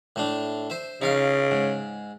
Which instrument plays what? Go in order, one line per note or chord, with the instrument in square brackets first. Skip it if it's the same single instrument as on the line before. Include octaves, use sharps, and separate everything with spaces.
[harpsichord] A2 A3 D4
C5 E5
[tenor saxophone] C#3 [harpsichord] D#4 F5 C6
[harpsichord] G#2